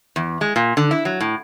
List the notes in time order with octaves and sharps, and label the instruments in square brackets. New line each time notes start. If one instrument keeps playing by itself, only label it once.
[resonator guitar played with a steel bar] E2
G#3
A#2
D3
E4
F#3
A2